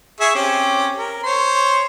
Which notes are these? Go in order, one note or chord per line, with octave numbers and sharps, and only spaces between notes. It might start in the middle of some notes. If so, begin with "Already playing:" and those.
G#4 E5 C#6
C4 C#4 G4
A#4
C5 C#5 C6